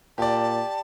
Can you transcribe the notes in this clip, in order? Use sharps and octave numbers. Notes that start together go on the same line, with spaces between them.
A#2 G4 D5 A5